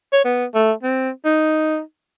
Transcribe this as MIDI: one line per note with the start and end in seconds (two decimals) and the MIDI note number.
0.13 0.21 73
0.25 0.45 59
0.54 0.72 57
0.83 1.10 60
1.25 1.80 63